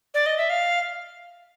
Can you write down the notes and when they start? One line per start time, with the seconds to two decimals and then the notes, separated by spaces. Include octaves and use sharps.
0.14 D5
0.26 D#5
0.38 E5
0.50 F5